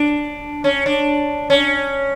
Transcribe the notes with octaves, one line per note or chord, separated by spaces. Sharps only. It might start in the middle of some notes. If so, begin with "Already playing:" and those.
Already playing: D4
C#4
D4
C#4